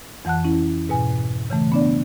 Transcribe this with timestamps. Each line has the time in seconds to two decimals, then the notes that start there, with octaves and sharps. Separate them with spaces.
0.25 F2 E3 F#5 A5 F#6
0.44 C#4 E4
0.89 G#2 B2 G#5
1.50 C#3 E3 A3
1.72 B3 D4 D5